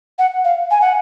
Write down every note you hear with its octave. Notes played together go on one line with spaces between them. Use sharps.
F#5
F5
G#5
F#5